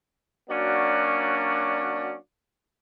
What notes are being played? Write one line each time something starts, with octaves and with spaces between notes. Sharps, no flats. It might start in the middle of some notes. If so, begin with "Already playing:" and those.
F#3 A#3 C#4 D4 F#4 D5